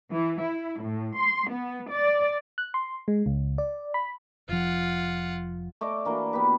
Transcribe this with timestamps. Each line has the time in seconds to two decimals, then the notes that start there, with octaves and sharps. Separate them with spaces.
0.11 E3
0.41 E4
0.82 A2
1.17 C6
1.50 B3
1.91 D5
2.58 F#6
2.74 C6
3.08 G#3
3.26 C#2
3.58 D5
3.94 B5
4.49 F1 F3 F4 F#5
5.81 A3 D5 D#5 D6
6.05 E3 A#3 D4 F#4
6.33 B3 G4 B4